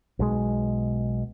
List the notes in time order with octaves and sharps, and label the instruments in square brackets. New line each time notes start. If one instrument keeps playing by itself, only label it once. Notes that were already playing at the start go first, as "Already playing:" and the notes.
[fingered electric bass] B1 B2 E3 G#3